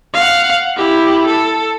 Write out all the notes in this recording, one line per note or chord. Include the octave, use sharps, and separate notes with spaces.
F5 F#5
E4 G4
A4